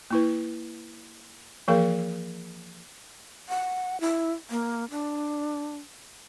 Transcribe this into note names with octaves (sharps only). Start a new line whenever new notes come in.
A#3 E4 B4
E3 F3 A#3 G#4 A#4 F5
F#5
E4
A#3
D4